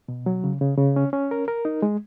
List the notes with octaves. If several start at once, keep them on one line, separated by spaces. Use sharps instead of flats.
B2
F#3
C#3
C#3
C#3
C#4
C#4
A#4
A#4
D#4
G#3